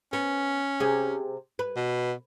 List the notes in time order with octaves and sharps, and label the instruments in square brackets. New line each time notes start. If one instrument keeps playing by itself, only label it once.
[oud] B3 [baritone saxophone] C#4
[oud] C3 G#4
B4
[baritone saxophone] B2